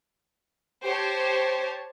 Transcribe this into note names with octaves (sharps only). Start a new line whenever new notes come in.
G4 C5 C#5 A5